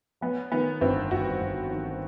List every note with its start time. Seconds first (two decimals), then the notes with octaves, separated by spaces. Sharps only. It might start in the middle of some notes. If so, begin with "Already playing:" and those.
0.21 F#3 B3
0.52 D#3 B3
0.81 G1 C4
1.11 G1 F#4
1.41 G1
1.71 D#3